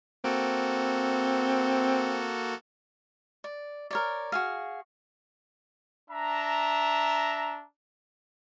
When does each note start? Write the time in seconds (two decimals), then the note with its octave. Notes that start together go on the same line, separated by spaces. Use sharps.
0.24 A#3 C4 F#4 A4
3.44 D5
3.91 A#4 C#5 D5
4.32 F#4 G#4 F5
6.10 D4 E5 A#5